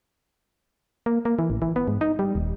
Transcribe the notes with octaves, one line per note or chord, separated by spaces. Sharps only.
A#3
A#3
E3
A1
E3
B3
G#2
D#4
G3
D#1